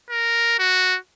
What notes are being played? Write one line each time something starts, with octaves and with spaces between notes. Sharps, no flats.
A#4
F#4